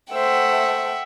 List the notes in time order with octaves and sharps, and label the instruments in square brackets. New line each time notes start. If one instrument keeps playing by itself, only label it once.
[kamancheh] A3 C5 [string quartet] E5 F#5 G5